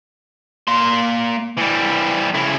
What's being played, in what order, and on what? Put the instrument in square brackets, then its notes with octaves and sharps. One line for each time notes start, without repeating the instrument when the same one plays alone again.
[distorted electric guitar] A#3 C6
E3 G3
C#3 E4